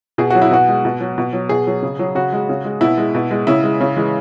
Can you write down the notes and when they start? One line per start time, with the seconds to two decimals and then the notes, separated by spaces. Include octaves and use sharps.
0.18 B2 G#4
0.30 F#3 F#4
0.42 E4
0.51 B2 F#4
0.69 G#3
0.85 B2
1.00 F#3
1.18 B2
1.33 F#3
1.49 B2 G#4
1.67 F#3
1.82 C#3
1.99 F#3
2.15 C#3 F#4
2.33 G#3
2.49 C#3
2.64 G#3
2.81 B2 E4
2.98 G#3
3.15 B2
3.31 G#3
3.47 C#3 E4
3.64 G#3
3.81 C#3
3.96 E3 G#3